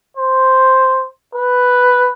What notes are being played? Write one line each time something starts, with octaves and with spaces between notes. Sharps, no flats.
C5
B4